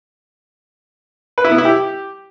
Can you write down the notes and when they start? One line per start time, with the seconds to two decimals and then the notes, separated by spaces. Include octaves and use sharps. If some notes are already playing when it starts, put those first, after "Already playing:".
1.38 B4
1.44 E4
1.51 B3
1.58 E4
1.65 G4